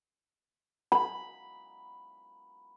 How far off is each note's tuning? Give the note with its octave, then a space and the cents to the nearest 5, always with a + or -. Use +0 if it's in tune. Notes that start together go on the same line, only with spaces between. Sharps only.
B5 +0